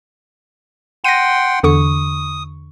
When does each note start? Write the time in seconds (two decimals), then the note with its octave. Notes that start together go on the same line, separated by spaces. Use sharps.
1.04 F#5 G5 C6 A#6 D#7
1.63 E2 D3 C#6 D#6